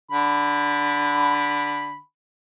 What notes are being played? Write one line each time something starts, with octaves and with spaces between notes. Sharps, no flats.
D3 B5